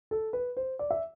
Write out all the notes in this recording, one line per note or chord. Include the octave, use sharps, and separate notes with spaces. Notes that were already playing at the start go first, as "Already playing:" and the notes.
A4
B4
C5
D5
E5